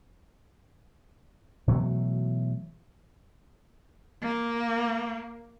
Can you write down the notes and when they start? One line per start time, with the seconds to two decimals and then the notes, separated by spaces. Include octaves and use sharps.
1.68 B2 E3 F#3 A3
4.23 A#3